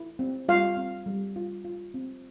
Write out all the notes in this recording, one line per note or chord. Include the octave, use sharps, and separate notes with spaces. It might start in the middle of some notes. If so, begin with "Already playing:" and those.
Already playing: E4
C4
G3 F4 F5
C4
G3
F4
F4
C4